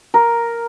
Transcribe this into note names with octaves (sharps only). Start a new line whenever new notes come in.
A#4